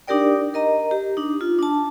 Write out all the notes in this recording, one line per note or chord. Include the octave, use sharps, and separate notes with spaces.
D4 D#4 G4 A#4 D5 G5
A#4 D#5 A#5
G4
D4 D#4
F4
D4 A5